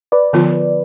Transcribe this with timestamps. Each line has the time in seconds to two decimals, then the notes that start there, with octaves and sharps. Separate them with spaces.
0.12 B4 D5
0.33 D3 F3 B3 F4